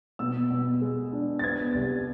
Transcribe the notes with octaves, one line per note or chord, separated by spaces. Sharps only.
B2 E6
B2
G#3
D4
A6
B3 G#6
C2